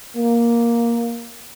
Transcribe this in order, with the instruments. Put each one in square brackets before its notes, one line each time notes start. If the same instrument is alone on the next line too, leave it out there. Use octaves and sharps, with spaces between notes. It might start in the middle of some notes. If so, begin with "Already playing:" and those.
[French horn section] A#3